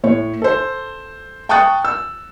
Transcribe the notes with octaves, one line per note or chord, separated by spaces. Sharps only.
A2 C#5
A4 C5
G5 A5 C#6 D#6 F#6 A6
E6